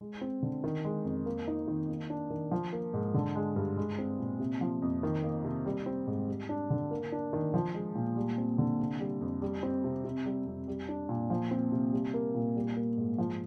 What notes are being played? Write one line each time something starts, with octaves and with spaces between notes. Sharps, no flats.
G#3
C4
D3
D#3
G#3
F2
A#3
D#4
D#3
A#3
D4
D#3
F3
A#3
G#2
D3
G#3
G2
G#3
C4
A#2
C3
F3
F2
D#3
A#3
C3
G3
C4
G#2
G3
D4
D3
A#3
D4
D#3
F3
G#3
A#2
G3
C4
D3
C3
G3
F2
G3
C4
C3
C3
G3
F2
G3
D4
A#2
F3
C4
C3
G3
A#3
A#2
G3
A#3
G#2
F3